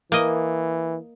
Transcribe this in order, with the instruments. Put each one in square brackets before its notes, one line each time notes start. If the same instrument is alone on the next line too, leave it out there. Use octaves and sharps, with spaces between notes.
[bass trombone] E3 [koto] A#3 D#5